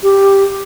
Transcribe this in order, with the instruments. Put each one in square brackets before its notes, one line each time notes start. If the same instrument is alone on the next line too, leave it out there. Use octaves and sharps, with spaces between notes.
[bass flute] G4